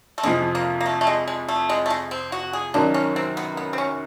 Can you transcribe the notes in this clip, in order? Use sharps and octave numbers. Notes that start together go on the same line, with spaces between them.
A3
F2 C3 F3 G#3
A#3
A#3
A3
A3
G#3
G#3
A3
G#3
A3
G#3
C4
F#4
G#4
F#2 D#3 F#3 D4
C#4
C4
B3
B3
C4
C#4